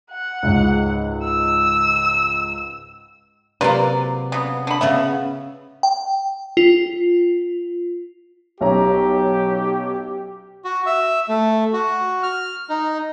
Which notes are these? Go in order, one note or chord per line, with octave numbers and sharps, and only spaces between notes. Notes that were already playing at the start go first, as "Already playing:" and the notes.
F#5
C#2 G#2
E6
C3 F#3 A#3 F4 B4 D5
C#3 B3
D3 B5
C#3 B3 C#4 E5
G5
F4
B1 C#4 G4 A#5
F#4
E5
A3
F#4
F6
D#4